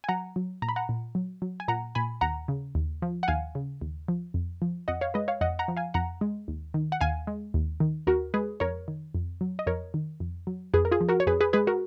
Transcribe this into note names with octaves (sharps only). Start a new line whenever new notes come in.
G#5
F#3 F#5 A#5
F#3
A#2 A#5
B5
F#5 A#5
A#2
F#3
F#3
G#5
A#2 F#5 A#5
A#2 G#5 B5
D#2 F#5 A#5
C#3
D#2
F3
F#5
D#2 F5 G#5
C#3
D#2
F3
F2
F3
F2 D#5 F#5
C#5 F5
G#3 B4 D#5
C#5 F5
F2 D#5 F#5
F#5 A#5
F3
F5 G#5
F2 F#5 A#5
G#3
D#2
D#3
F#5
D#2 F5 G#5
G#3
D#2
D#3
D#2 F#4 A#4
G#3 G#4 B4
F2 A#4 C#5
D#3
F2
F#3
D#5
F2 A#4 C#5
D#3
F2
F#3
F2 G#4 B4
A#4
F4 G#4
F3
F#4 A#4
C#5
F2 G#4 B4
G#4 B4
G#3 G#4 B4
F#4 A#4